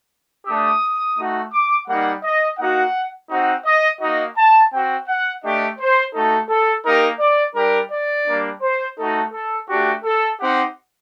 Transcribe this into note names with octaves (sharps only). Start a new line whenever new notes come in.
A3 D4 G4 D#6
A3 D#4 F#4
D6
G3 A#3 D#4 F#5
D#5
A#3 D#4 F#4 F#5
C4 D#4 F#4 F#5
D#5
A#3 D#4 F#4 D#5
A5
C4 F#4 G5
F#5
A3 D4 G4 D#5
C5
A3 D#4 F#4 A4
A4
A#3 D#4 G4 A#4
D5
G3 D4 G4 A#4
D5
G3 A#3 D4
C5
A3 D#4 F#4 A4
A4
A3 D4 F#4 G4
A4
C4 D#4 G4 F#5